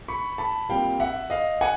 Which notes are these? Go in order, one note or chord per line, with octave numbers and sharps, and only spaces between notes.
B5 C#6
A5 B5
A#2 G3 C4 F5 G5
E5 F#5
D#5 F5
F#5 G#5